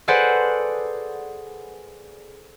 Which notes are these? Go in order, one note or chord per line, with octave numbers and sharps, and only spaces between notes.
G#4 A4 B4 C5 D5 F#5